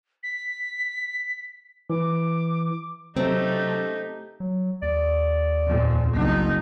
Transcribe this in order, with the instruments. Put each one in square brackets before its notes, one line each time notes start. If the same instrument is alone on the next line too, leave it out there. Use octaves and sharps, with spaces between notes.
[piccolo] B6
[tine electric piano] E3 [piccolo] D6
[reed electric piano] C3 F#3 C#4 [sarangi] A3 [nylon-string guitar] C4 [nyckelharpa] D#4 G4
[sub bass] F#3
[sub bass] D#2 [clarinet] D5
[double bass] F2 A#2
[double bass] F#1 D#4 [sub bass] C2 [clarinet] B3